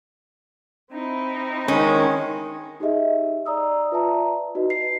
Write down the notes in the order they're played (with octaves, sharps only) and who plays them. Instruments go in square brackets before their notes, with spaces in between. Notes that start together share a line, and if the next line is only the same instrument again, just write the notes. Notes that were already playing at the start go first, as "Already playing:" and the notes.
[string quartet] C4 D#4 E4
[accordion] D#3 [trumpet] G#3 [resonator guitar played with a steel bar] C#4
[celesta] D#4 G4 G#4 D#5 E5
D5 A#5 D#6 E6
F4 B4 D5 E5 A5 A#5
D#4 F#4 B4 D#5
C7